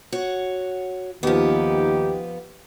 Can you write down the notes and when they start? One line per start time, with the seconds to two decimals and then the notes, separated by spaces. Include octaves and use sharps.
0.12 F#4 C#5 F#5
1.23 D#2 F3 B3 D#4 G4